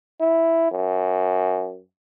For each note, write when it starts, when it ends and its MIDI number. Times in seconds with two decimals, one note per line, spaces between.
0.20 0.69 64
0.71 1.80 42